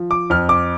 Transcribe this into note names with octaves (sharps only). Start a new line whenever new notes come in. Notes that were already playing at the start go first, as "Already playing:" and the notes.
Already playing: F3
D6
F2 F6
D6